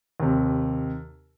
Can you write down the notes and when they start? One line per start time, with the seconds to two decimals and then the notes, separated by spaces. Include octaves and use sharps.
0.20 D#2 C3